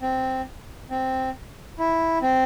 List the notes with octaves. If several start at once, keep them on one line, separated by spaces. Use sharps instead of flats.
C4
C4
E4
C4